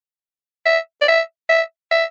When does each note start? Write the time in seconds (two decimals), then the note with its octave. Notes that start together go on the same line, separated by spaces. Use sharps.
0.66 E5
1.01 D5
1.08 E5
1.49 E5
1.91 E5